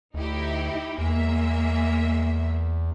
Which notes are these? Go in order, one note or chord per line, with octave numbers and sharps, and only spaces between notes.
D2 D#4 E4 G4
E2 G#3 A#3 E5